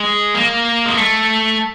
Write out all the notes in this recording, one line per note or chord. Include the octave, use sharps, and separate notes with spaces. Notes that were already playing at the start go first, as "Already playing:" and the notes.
Already playing: G#3
A#3
G#3
A3